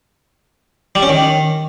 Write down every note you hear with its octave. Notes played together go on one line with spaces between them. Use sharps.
G3
C#4
D#3